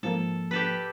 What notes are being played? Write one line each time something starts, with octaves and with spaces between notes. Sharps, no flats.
G#2 F3 A#3 A4
G4 A4 B4